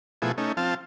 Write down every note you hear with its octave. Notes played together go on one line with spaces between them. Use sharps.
B2 F3 A3 E4 G#4
A3 C#4 D#4
F3 C4 F5 A5